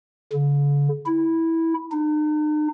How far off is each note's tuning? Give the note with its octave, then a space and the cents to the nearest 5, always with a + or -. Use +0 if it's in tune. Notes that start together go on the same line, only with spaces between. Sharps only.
D3 -45
E4 -10
D#4 -45